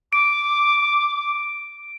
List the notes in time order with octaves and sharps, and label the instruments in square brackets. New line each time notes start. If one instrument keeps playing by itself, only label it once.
[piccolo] D6 [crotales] D7